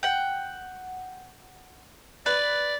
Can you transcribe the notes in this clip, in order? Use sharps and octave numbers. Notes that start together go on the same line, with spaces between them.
F#5 G5
B4 D5